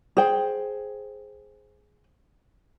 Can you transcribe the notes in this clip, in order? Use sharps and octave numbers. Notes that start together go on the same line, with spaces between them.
G#4 C5 G5